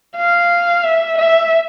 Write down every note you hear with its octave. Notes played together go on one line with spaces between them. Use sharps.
F5
E5
E5